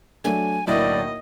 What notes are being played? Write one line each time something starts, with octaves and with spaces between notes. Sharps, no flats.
F#3 A3 D4 G#5
B1 A2 D3 A#3 E4 D5 D#5